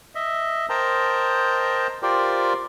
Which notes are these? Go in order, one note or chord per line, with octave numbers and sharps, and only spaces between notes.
D#5 E5
A#4 C5 D#5 G5 A5 A#5
F4 G4 A#4 C5 D5 G5